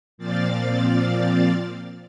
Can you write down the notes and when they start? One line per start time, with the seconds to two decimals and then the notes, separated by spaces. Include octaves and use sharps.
0.18 A#2 F3 C4 D5 F5 A6